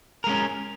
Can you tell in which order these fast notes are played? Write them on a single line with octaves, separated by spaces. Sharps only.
A#4 G#3 C#4